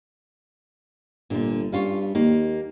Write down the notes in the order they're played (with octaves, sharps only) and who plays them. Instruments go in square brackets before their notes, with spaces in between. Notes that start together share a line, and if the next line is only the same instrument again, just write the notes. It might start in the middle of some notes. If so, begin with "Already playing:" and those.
[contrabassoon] G1 [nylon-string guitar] A#2 D3
[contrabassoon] G2 [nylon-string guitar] C#4 F4 C#5
[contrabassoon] D#2 [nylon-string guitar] A#3